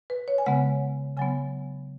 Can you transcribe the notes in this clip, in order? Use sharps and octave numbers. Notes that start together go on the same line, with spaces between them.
B4
C#5
G#5
C#3 G#3 B3 F#5
C#3 F#3 B3 G#5